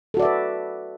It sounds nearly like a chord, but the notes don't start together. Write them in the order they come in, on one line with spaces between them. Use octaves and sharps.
A4 F#4 D5 E5 B4